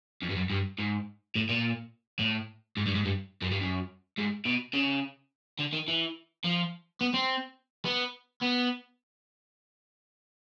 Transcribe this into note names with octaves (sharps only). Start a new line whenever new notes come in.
F2
G2
F#2
G2
G#2
A2
A#2
A2
G#2
G2
G#2
G2
F#2
G2
F#2
G#2
B2
C#3
D3
D#3
E3
F3
B3
C4
B3
B3